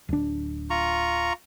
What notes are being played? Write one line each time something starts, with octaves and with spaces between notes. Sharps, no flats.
D1 D4
F4 A#5 C#6